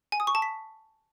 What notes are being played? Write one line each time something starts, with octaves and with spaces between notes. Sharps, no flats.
G#5
D#6
C#6
A5
B6